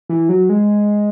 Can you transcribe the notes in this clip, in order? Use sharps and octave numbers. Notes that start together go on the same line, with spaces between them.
E3
F#3
G#3